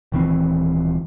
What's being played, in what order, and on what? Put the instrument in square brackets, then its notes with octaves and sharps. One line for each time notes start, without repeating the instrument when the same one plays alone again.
[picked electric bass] D#1 D#3 E3 C4